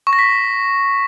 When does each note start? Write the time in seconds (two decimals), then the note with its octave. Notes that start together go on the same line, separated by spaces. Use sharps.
0.07 C#6
0.13 A#6
0.19 B6